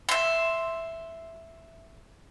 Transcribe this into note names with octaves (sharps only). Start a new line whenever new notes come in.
E5 C6